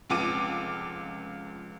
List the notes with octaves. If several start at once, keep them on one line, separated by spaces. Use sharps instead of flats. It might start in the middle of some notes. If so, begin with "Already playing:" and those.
F1 C#2 F4 D6 D#7